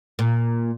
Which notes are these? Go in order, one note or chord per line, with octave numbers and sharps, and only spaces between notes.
A#2